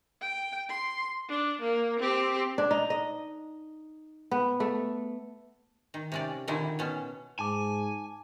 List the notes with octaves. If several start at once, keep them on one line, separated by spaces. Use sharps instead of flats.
G5
C6
D4
A#3
C4 G4
D4
D#4
D#5
B3
A3
D#3
C3 C#4 D5
A#2 D3 D#3 E4
B2 C#4
G#2 G#5 A5 D6